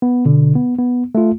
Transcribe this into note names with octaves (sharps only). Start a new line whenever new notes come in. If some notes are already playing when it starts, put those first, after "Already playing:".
B3
B2 D3
B3
B3
A3 F4